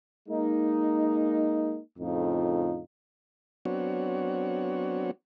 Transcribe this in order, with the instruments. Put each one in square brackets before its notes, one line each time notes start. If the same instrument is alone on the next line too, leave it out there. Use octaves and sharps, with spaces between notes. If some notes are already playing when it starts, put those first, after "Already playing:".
[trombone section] G#3 A#3 D#4
F2 A2 C#3 D#4 F4
[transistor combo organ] F#3 B3 C4 D4 F#4 C#5